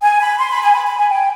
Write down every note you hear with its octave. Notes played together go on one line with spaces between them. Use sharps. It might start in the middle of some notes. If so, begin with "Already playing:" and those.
G#5
B5
C6
B5
G#5
B5
B5
G#5
G5